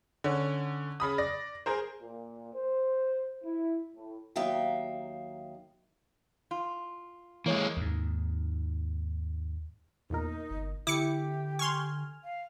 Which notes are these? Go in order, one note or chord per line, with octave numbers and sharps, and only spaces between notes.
D3 C#4
C#3 B5 D#6
D5 A#6
G#4 A#4 C5
A#2
C5
E4
A2
D#2 F#3 D#4 E5 F5 G5
F4
E3 G#3 A#3 C#5
D#2 G#2
E2 A#2 D#4 A#4
G1
D3 E4 G4 D6 C#7
G#5 C6 C#6 F6
F5